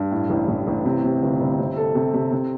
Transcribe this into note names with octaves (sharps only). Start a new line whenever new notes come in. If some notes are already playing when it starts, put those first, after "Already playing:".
Already playing: G2
A2
A1
A1
A1
C3
C3
G1
G1
C3
A4
C3
C3
C3